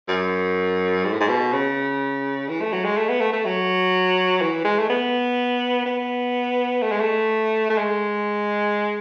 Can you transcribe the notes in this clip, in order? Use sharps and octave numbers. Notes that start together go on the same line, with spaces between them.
F#2
G#2
A2
G#2
B2
C#3
E3
A3
F#3
G#3
A3
B3
A3
A3
F#3
E3
G#3
A3
B3
B3
A3
G#3
A3
A3
G#3